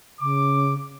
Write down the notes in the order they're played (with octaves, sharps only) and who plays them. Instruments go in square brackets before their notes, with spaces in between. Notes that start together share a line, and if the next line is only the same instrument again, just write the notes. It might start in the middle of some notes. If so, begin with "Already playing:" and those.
[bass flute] C#3 [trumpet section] D6